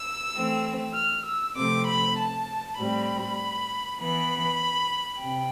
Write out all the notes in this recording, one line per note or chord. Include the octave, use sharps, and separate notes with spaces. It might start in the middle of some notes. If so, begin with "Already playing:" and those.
Already playing: E6
E3 A3 C4
F6
E6
C3 F3 A3 C4 D6
B5
A5
A2 G3 C4 B5
E3 B3 B5
C3 G5